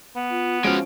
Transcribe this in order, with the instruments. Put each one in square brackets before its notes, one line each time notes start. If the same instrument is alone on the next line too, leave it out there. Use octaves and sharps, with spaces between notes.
[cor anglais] B3
[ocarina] F4
[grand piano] F3 C#4 D7 [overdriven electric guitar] G#3 F5 [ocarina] F#4